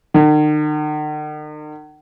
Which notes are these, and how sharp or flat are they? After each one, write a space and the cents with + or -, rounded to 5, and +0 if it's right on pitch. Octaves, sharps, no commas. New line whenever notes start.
D#3 -45